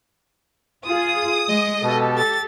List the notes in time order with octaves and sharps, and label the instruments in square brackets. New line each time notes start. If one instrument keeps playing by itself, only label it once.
[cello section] F4 G#4 [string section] D#6
[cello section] G#3 [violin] D#5
[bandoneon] B2 [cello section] G4 A4
[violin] A6